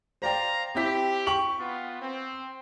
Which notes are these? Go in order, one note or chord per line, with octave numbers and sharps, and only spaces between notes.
C5 D5 F5 G5 A#5
C4 E4 G4 B6
G5 C#6 F#7
B3 F4
C4